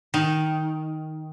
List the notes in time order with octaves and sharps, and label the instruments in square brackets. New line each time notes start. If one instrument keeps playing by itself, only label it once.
[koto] D#3